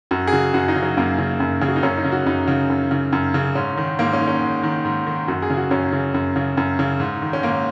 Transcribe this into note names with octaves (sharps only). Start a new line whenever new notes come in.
F#2 F#4
G#4
C#3 F#4
F#2 F#4
D#4
C#3
F#3
F#2 A#3
C#3
F#2
C#3 G#4
F#4
D#4
F#2 C#4
D#4
C#3
F#4
F#2 D#4
C#3
F#2
C#3
F#2
C#3
G#2 C#4
D#3
G#2 A#3
C#4
D#3
C#4
G#2
D#3
G#2
D#3
F#2 F#4
G#4
C#3
F#4
F#2 C#4
C#3
F#2
C#3
F#2
C#3
G#2
D#3
C#4
G#2 A#3